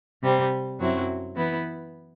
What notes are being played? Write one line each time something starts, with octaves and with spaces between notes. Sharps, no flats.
C3 G3 C4
F#2 F#3 C4 E4
E3 B3 E4 B4